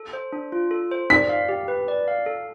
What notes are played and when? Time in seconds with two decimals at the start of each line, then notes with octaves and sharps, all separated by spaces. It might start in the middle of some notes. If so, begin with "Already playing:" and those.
Already playing: A4
0.13 C5
0.33 D4
0.52 F4
0.71 A4
0.91 C5
1.10 D5 B6
1.29 F5
1.49 G4
1.68 B4
1.88 D5
2.08 F5
2.26 A4